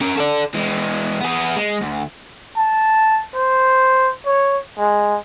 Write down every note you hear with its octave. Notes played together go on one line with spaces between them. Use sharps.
C#4 A#4
A4 D5
E3 G#3
B3 G#4
G#3
D2
A5
C5
C#5
G#3